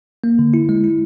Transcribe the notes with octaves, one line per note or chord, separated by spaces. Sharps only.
A#3
D3
E4
G#3
E4